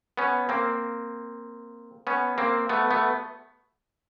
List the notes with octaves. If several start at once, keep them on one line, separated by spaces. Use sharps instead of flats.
B3 C#4
A#3 C4
B3 C#4
A#3 C4
A3 B3
A3 B3